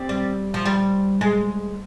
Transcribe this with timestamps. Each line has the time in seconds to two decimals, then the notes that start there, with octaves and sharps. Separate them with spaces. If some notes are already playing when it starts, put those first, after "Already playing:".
Already playing: C4 G4 D5
0.09 G3
0.54 F3
0.66 G3
1.21 G#3